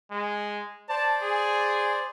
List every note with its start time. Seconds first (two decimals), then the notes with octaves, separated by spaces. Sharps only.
0.11 G#3
0.89 C5 D5 A5
1.22 G#4